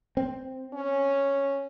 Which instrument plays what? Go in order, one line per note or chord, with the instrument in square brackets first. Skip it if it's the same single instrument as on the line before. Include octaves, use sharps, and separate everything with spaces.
[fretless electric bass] C4
[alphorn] C#4